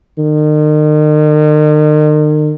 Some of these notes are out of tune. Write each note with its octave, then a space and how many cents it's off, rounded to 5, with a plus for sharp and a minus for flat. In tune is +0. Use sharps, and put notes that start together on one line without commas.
D#3 -40